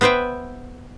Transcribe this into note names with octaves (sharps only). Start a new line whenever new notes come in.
B3 B4 C5 E5 G5